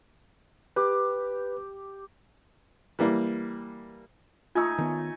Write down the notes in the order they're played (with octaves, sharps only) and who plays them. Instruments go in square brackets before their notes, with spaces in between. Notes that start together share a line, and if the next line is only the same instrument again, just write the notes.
[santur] G4 [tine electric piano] B4
[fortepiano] E3 G3 A#3
[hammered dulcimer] A3 D#4 G#5 [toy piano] F4 E6
[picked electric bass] D#3 B3